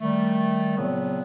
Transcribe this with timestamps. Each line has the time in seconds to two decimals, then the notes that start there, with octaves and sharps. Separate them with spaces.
0.01 D#3 G3 A3
0.78 A#2 C#3 F3 F#3 B3 C4